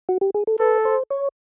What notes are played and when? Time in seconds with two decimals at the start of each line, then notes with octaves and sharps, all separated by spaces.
0.09 F#4
0.21 G4
0.34 G#4
0.47 A4
0.60 A4 B4
0.85 C5
1.11 C#5